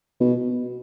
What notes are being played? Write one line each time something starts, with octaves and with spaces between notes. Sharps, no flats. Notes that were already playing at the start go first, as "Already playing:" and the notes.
B2